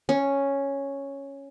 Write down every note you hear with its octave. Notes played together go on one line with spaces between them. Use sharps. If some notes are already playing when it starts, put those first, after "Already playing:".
C#4